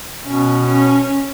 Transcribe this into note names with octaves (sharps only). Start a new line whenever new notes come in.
B2 C#4
C#4